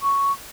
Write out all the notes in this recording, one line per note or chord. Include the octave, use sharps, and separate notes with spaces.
C#6